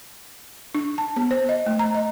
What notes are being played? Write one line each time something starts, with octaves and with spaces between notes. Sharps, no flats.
D4
A5
B3
C5
D#5
A3
A#5
D#5